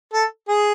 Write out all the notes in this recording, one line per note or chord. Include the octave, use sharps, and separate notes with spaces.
A4
G#4